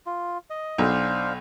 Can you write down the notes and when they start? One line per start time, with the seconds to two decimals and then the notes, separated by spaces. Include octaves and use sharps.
0.06 F4
0.50 D#5
0.78 B1 D4 C5 F5